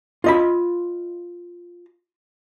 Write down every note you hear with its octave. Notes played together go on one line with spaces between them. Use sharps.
F4 D#5 B5